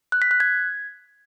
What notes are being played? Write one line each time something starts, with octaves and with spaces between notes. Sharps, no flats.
F#6
B6
F#6
G#6